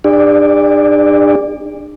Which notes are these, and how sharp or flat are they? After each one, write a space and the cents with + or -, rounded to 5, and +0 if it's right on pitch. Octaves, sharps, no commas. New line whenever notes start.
D4 +40 G#4 -45 D5 +0